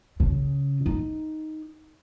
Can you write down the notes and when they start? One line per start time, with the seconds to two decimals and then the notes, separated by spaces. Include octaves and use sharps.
0.20 C#3
0.86 D#4